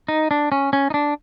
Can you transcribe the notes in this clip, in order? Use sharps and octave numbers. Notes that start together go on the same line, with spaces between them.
D#4
D4
C#4
C#4
D#4
D4